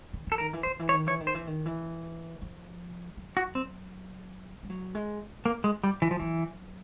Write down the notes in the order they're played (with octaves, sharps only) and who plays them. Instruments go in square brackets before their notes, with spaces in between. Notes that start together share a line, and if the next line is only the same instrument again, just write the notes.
[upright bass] D#3
[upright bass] E3 [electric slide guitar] A4
[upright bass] D#3 [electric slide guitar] A#4
[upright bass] E3
[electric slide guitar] C5
[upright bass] D#3
E3
[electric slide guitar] C#5
[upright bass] D#3
[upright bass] E3 [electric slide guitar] C#5
[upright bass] D#3
[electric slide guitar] C5
[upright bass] E3
D#3
E3
F3
F#3
[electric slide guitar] F#4
C4
[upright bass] G3
F#3
G#3
[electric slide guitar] A#3
G#3
G3
E3
F3
[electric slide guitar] E3 [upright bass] F#3